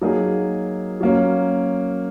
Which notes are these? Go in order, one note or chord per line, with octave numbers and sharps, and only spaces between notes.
F#3 A#3 D#4 G#4
F#3 A#3 C#4